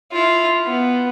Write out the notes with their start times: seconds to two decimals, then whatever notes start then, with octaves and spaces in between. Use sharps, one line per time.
0.12 E4 F4
0.66 B3